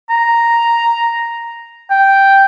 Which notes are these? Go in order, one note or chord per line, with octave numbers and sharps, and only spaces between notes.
A#5
G5